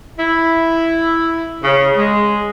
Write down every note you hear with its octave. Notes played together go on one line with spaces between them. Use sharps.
E4
C#3
G#3